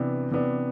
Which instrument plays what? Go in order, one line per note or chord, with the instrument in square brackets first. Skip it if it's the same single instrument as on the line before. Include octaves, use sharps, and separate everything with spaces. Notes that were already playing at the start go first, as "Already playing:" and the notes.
Already playing: [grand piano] C3 E3 B3 D4
C3 E3 B3 D4